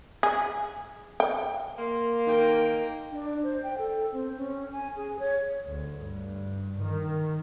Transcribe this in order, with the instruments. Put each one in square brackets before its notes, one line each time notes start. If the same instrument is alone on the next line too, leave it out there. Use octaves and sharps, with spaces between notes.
[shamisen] G#4
G5
[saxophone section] A#3 [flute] C6
[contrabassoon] D#3 [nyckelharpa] A#4 G5
[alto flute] D4
C5
G5
A4
C4
C#4
G#5
G#4
C#5
[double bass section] D2
G2
D#3